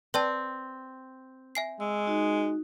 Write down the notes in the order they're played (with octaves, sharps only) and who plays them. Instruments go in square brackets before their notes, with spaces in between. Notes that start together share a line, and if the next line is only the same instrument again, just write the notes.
[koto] C4 [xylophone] B4 D5 A5
[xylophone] E5 G#5 C7
[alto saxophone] G#3 [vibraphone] E6
[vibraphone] D#4 F#4